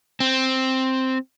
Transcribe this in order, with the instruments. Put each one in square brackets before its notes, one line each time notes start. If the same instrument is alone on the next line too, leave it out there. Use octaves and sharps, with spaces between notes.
[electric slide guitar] C4